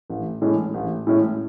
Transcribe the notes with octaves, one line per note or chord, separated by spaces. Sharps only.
A1
A2 E3 G#3 C#4
A1
A2 E3 G#3 C#4